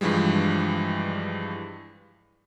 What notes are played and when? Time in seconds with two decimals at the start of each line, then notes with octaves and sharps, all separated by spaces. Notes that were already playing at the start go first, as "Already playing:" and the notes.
0.01 G2 E3 F3 G3 G#3